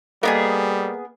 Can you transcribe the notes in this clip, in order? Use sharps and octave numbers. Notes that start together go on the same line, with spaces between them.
G3 A#3 B3 D4 G#4 A4 D#5